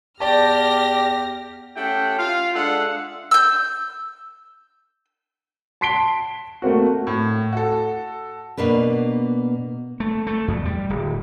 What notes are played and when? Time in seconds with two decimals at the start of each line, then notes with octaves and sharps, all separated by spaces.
0.20 E2 G4 D5 A5 F6 A#6
1.76 A3 C#4 E4 G4 F#5 G5
2.19 F4 F5
2.55 G#3 D4 A4 E5 F#5
3.31 E6 G6
5.81 A5 C6 B6 C7 D7 G7
6.62 A3 A#3 C4 F#4
7.07 A2
7.53 F#4 A4
8.57 B2 A#3 D4 B4
10.00 A3
10.27 A3
10.48 E2
10.65 G3
10.90 D1